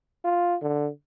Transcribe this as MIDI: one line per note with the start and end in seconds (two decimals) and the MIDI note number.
0.24 0.56 65
0.62 0.89 50